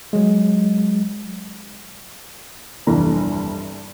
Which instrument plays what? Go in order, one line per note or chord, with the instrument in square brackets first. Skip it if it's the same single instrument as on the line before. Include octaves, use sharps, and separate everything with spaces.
[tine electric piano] F#3 G#3
[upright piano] F1 D2 G2 E3 E4 A#5